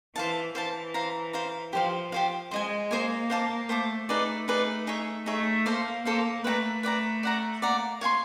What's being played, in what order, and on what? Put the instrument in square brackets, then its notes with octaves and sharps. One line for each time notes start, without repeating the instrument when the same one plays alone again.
[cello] E3 [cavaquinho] C5 F5 A5
[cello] E3 [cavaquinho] C5 F5 A5
[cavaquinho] C5 F5 A#5
C5 F5 A#5
[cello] F3 [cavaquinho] G4 C5 F5
[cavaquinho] G4 C5 F5
[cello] G#3 [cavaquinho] C5 D#5 G#5
[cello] A#3 [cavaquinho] C5 D#5 G#5
[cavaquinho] C5 F5 A5 D6
[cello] A3 [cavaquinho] C5 F5 A5 D6
[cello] A3 [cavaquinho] D#4 G#4 B4 D5
[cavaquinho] D#4 G#4 B4 D5
D#4 G#4 C#5 E5
[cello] A3 [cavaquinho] D#4 G#4 C#5 E5
[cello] A#3 [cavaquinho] A4 C5 F5
[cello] A#3 [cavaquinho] A4 C5 F5
[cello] A3 [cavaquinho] B4 D5 F#5 A#5
[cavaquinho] B4 D5 F#5 A#5
D5 F#5 A#5
[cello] A#3 [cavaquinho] D5 F#5 A#5
[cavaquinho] C#5 F5 G#5 C6